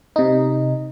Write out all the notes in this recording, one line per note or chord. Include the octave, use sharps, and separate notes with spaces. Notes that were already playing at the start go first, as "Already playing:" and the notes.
C3 D#4